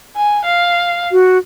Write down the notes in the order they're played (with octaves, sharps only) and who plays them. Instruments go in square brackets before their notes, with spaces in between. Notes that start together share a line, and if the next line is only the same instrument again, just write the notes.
[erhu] G#5
F5
[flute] F#4